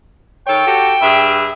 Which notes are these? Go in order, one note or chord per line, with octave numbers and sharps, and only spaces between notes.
D#3 A4 C#5 G5
F#4 G4 A4
G2 G#4 E5